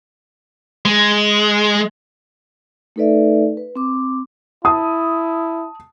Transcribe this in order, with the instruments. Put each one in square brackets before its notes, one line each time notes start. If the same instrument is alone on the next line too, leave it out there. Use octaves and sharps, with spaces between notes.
[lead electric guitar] G#3
[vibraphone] A3 D#4 A4 B4 D5 E5
B4
C4 D6
[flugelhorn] E4 [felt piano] A5 D#6